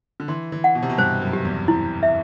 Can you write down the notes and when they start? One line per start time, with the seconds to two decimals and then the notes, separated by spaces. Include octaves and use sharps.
0.20 D3
0.28 E3 C6
0.52 E3
0.64 F#5
0.75 B2
0.83 C3
0.90 B2
0.98 G2 C5
1.21 F#2
1.33 G4
1.45 E2
1.68 E4
2.03 E5